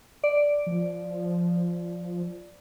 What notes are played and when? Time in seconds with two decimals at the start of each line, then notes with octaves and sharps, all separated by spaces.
0.24 D5
0.67 F3